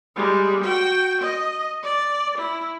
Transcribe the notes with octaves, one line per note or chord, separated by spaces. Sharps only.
G3 G#3
F#4 G5
D#5
D5
E4